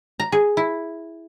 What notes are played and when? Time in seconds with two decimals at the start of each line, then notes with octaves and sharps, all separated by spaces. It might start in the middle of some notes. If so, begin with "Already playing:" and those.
0.20 A#5
0.32 G#4
0.57 E4